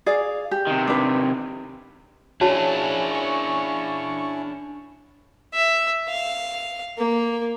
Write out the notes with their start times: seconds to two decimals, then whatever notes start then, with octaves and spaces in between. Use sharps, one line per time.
0.06 G#4 D5 F5
0.51 G4
0.67 C3 D#3
0.87 D4 B4
2.41 C#4 D4 E4 F#4 G#4 C#5 A5
3.11 C#6
5.53 E5
6.09 F5
6.99 A#3